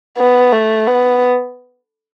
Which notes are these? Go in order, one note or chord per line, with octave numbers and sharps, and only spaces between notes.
B3
A3
B3